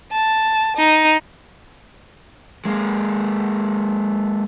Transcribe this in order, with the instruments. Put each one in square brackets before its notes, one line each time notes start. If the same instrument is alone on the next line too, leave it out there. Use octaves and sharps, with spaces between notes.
[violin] A5
D#4
[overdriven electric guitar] G#3 A#3